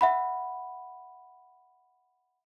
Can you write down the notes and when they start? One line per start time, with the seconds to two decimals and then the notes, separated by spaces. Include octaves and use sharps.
0.01 E5 F#5 B5